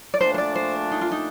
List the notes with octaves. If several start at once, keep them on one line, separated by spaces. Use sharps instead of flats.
D5
A#2 F3 A3 D4 C5
C5
D5
C5
D#4
F4
D#4